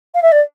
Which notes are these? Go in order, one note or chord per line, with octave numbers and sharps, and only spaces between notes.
F5
E5
D5